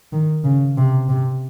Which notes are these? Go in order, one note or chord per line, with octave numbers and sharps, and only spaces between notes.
D#3
C#3
C3
C3